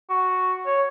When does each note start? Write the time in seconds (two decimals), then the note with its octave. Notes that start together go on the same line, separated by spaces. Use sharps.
0.10 F#4
0.66 C#5